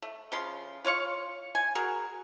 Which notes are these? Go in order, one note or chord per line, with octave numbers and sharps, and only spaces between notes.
A3
C#3 F3 C6
F4 C#5 F5 C#6
G#5
F#4 G#4 A#4